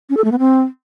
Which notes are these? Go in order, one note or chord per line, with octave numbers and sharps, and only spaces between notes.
C#4
A4
A3
B3
C4